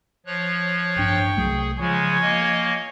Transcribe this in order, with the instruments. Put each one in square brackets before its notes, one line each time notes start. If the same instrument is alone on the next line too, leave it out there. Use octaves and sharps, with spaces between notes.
[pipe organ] F3 C#5 F#6
[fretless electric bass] A1 G2 D4 [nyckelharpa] G5 C#6
[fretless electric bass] C2 F#3 A3 [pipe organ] G#4
[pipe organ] C#3 G#3 [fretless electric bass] F3 [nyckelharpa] C#5 G#5
[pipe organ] A#3 D#5